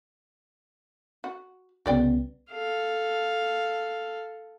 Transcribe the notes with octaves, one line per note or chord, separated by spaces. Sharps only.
F#4
C2 C#3 B3 F#4 D5 G5
A4 F5